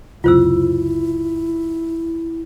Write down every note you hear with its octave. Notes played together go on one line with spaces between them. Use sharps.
C#2 F#2 C3 E4 F4 C5 E6